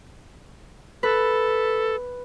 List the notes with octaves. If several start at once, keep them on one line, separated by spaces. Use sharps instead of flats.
A4 B4